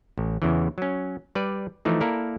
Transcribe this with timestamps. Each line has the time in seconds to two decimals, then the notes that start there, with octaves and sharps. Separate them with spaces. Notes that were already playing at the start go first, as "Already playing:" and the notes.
0.18 A1
0.42 E2 C#3 E3
0.78 F#3 C#4
1.35 G3 B4 D5
1.85 E3 F3 A3 D#4
2.01 A#3 E4 A4 A#4 D5